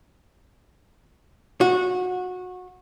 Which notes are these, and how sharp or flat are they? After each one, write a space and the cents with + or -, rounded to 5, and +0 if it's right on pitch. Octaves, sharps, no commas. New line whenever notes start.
F#4 -20